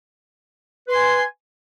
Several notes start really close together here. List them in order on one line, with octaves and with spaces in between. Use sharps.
B4 C6 G#5